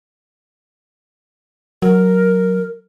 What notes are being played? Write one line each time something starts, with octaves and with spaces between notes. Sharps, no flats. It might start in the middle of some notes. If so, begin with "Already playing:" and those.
F#3 A#4